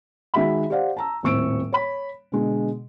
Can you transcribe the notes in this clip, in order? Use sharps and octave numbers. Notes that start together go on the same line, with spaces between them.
D#3 G#3 F#4 E5 B5
G4 C5 D5 F5 F#5
A5 A#5 E6
D#1 A2 C4 C#6 E6 D7
C#5 B5
B2 D3 G#3